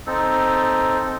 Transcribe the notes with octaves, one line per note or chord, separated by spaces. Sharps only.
C4 D#4 A4